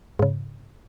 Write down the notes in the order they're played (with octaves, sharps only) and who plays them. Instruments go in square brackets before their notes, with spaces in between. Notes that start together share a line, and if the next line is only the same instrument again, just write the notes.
[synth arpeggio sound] G#2 C#3